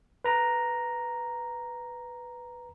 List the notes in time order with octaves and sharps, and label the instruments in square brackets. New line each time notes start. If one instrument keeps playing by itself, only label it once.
[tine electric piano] B4 A#5